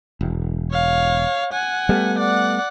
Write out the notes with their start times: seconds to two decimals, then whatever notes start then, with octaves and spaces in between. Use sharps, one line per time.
0.21 E1
0.71 C#5 F5
1.52 F#5 G#5
1.89 G3 A3 B3
2.18 D5 F#5